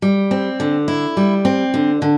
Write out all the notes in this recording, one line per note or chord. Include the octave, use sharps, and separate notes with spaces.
G3
C4
D3
E4
G3
C4
D3
D3